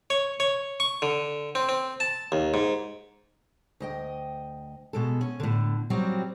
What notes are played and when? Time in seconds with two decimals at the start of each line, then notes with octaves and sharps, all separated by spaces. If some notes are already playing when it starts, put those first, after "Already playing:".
0.10 C#5
0.40 C#5
0.80 C#6
1.02 D3
1.55 C4
1.69 C4
2.00 A5
2.32 D#2
2.54 G#2
3.80 D2 D#5 G5
4.93 B2 G#3 A4
5.21 C#4
5.40 A2 D3
5.90 F#3 G3 C4 F4 F#4